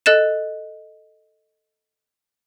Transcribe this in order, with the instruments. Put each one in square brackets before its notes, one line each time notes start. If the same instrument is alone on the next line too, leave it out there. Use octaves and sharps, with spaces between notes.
[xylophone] A4 D#5 F#6 A6 E7